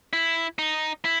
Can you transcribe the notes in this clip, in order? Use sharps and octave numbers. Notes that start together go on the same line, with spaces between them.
E4
D#4
E4